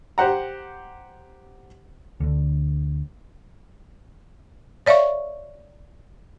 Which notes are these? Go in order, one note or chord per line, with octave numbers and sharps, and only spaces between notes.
G4 C5 F#5 A#5
D2 D3
C#5 D5 E5 F5 C#6